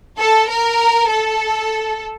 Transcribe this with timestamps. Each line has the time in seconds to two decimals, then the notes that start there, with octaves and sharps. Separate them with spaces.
0.19 A4
0.49 A#4
1.08 A4